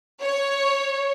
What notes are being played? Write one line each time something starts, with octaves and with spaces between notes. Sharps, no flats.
C#5